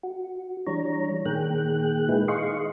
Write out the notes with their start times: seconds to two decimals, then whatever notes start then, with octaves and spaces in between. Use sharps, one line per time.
0.03 F#4
0.67 E3 G3 D4 C#5 A#5
1.26 A#2 D#3 A#3 G#4 G5 F#6
2.09 G#3 D#4 E4 G#4 B4
2.28 G#4 D#5 F5 C6 C#6